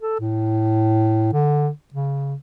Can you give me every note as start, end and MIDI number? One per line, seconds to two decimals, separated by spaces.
0.01 0.16 69
0.20 1.28 45
1.33 1.70 50
1.94 2.35 49